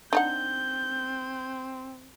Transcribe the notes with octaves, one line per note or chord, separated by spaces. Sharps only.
C4 D4 D#4 F#5 G6